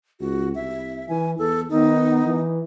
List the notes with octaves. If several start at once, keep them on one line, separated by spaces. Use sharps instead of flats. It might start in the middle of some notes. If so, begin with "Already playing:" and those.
C#2 F#4
C2 E5
E3 G#5
E2 A4
D#3 B3 D#4
E3